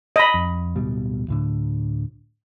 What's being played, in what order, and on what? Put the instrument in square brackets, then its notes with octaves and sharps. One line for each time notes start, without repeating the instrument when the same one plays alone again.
[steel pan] D#5 B5
[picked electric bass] F2
D1 B2 G3
D2 A2 D3